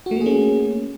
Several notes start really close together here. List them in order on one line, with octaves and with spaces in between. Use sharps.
F#4 A3 A#3 G#4 C#4